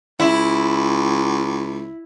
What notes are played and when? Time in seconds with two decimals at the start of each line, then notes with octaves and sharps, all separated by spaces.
0.20 C#2 E4